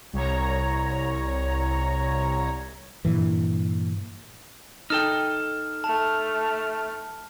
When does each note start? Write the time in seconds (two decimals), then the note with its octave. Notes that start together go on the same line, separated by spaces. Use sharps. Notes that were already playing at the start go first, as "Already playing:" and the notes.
0.13 C2 C#5 A#5
3.05 G2 A#2 E3
4.90 D#4 A4 G5 F6
5.84 A3 A5 F6